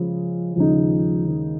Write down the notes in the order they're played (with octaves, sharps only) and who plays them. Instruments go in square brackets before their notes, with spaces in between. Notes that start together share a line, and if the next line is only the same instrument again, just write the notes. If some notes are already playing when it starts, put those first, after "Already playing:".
Already playing: [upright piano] C#3 G#3 [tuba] F3
[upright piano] D#2 C#3 G#3 D#4 [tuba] F3
[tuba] D#3